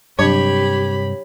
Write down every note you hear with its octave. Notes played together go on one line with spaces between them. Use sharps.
G2 C3 F#3 D4 G4 C#5 B5